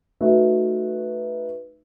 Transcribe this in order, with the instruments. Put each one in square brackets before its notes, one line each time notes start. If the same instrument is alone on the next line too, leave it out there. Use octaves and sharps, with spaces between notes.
[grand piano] A3 D#4 F#4 B4 E5